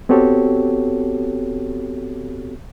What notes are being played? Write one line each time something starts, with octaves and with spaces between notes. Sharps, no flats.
B3 C4 F#4 G4 A4 C#5